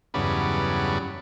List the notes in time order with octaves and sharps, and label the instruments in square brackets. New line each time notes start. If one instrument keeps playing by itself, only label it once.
[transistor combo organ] E2 G2 C#3 F#3 B4 D5